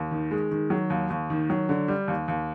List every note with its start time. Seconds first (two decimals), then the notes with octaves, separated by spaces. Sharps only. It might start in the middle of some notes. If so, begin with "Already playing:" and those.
Already playing: D#2
0.11 D#3
0.31 G#3
0.51 D#3
0.70 F#3
0.90 D#2
1.10 D#2
1.30 D#3
1.50 F#3
1.69 D3
1.88 G3
2.08 D#2
2.28 D#2